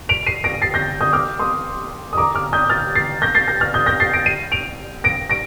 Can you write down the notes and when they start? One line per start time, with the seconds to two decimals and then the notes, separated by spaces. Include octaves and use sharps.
0.09 D7 F7
0.26 C7 D#7
0.44 A#6 D7
0.62 A6 C7
0.74 G6 A#6
1.01 D#6 G6
1.13 D6 F6
1.39 C6 D#6
2.13 D#6
2.17 A#5 D6
2.35 D6 F6
2.53 D#6 G6
2.69 F6 A6
2.95 A6 C7
3.22 G6 A#6
3.35 A6 C7
3.48 G6 A#6
3.60 F6 A6
3.74 D#6 G6
3.86 G6 A#6
4.00 A6 C7
4.13 A#6 D7
4.26 C7 D#7
4.52 D7 F7
5.04 A#6 D7
5.30 A#6 D7